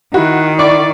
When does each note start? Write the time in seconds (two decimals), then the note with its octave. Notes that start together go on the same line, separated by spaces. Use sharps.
0.14 D#3 E4 F#4
0.59 E4 D5 C#6